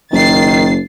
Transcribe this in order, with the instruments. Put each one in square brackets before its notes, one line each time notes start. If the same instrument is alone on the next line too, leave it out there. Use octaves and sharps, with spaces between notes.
[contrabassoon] F#1 [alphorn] D#3 [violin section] A6 C7